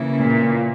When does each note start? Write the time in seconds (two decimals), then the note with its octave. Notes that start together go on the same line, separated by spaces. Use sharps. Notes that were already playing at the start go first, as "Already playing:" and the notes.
Already playing: C#3 E3 A#3 C#4 E4
0.20 A#2